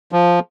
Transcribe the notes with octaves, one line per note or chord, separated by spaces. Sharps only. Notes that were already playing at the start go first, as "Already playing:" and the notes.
F3